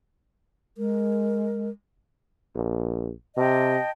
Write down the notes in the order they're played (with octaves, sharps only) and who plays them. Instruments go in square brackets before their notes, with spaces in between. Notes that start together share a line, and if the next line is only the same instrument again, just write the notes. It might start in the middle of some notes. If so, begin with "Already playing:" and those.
[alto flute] G#3 [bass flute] A#4
[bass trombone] A#1
[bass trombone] C3 [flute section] D#5 G5 A5